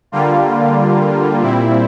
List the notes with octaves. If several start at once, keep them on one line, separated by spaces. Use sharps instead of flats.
D3 G3 A#3 F4
A#2 G3 C4 E4